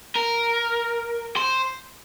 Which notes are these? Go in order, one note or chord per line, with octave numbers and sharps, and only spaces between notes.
A#4
C5